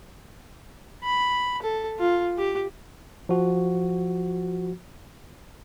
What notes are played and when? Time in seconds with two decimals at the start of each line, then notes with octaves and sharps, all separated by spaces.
1.03 B5
1.62 A4
1.99 F4
2.38 G4
3.29 F3 F#4